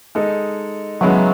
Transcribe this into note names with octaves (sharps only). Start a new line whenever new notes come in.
G#3 D#4 A4
C#3 F#3 G#3 B3 E4 B4